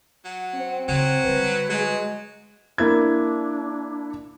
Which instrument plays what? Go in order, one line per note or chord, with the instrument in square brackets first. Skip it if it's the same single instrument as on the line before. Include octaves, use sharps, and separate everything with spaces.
[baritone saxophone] F#3 [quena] F#5
[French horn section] C4
[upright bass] C#3 D#4 [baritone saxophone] F#3
[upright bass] D3 G3 [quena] B4
[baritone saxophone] F#3 [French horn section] G#3
[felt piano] A#3 E4 G#6 [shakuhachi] D4